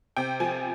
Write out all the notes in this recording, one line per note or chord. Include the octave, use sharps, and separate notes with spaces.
C3 G5
F3 G#5